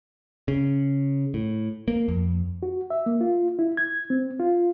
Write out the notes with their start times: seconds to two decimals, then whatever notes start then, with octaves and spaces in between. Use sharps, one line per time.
0.48 C#3
1.34 A2
1.88 A#3
2.08 F2
2.63 F#4
2.90 E5
3.06 A#3
3.21 F4
3.59 E4
3.77 G#6
4.10 C4
4.40 F4